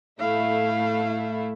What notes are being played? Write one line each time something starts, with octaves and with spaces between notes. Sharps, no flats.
A2 A3 E4 F5